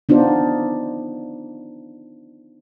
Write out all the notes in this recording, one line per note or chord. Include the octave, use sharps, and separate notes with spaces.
B3 D4 D#4 F4 C5